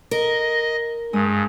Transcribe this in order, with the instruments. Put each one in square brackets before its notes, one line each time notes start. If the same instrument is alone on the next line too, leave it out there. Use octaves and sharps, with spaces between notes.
[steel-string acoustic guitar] A#4 [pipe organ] D#5
[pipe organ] G2 [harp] G#3 D#6